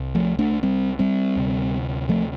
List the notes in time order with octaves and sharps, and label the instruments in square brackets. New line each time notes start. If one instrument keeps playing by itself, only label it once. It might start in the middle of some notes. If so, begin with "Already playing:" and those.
Already playing: [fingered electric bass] C2
F3 A3
A3 D4
G3 C4
G3 C4
D2 C3
F3 A3